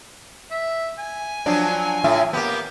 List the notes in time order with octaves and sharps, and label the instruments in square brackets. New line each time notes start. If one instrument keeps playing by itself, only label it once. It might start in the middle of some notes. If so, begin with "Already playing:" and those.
[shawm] E5
G#5
[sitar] F3 F#3 D4
A2 F4 E5
[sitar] A#3 B3 [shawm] G4